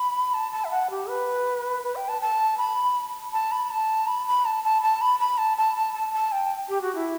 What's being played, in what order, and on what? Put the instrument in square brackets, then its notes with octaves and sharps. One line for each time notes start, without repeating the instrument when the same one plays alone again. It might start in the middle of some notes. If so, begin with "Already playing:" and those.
Already playing: [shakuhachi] B5
A5
A5
E5
F#5
G4
B4
B4
G5
A5
A5
B5
A5
B5
A5
B5
B5
A5
A5
A5
B5
B5
A5
A5
A5
A5
A5
G5
G4
F#4
E4